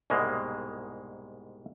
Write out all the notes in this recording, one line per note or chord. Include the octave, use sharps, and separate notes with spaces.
C2 G#2 B2 G#3 A#3